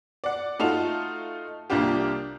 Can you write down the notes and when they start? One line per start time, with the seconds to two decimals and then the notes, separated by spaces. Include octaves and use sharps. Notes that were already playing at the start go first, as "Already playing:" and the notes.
0.24 D5 F#5
0.59 A3 D#4 F4 F#4 A5 F7
1.70 C2 A#3 D4 F4 G4